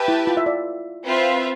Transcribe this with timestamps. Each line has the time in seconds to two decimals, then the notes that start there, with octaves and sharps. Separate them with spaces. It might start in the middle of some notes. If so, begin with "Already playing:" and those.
Already playing: G4 B4 E5 A5
0.08 E4
0.27 F4
0.37 E5
0.46 D5
1.04 C4 F4 B4 E5